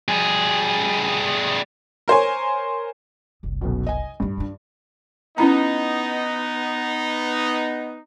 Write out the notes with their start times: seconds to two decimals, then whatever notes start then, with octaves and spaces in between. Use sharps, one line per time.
0.08 G3 G#4
2.08 A#4 C5 C#5 G#5
3.43 F#1 C2
3.61 B1 F#2 B2
3.87 D#5 G#5
4.20 D1 G2 D#4
4.37 D4 F4
5.38 B3 C#4 D#4 E4 A#5